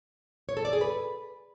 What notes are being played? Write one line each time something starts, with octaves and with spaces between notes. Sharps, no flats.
C#5
A4
D5
G#4
B4